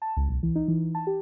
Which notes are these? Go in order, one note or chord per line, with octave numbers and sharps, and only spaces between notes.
A5
C#2
B1
E3
D#4
E3
A5
G4